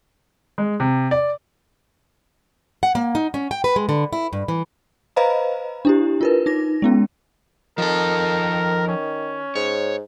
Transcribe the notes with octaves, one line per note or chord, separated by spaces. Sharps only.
G#3
C3
D5
F#5
A#3
D#4
C#4
G5
B4
G#3
D3
E4
G2
E3
B4 C5 D#5 F5 A#5 B5
D4 E4 G4
F4 A#4 B4
D#4 A#6
G#3 B3 C#4
D#3 F3 A4 A#4
C#4
G#2 C#5